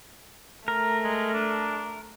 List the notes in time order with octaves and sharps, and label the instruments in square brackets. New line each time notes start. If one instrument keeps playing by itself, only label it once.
[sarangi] A3 [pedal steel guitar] A#4
[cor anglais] G#3
D4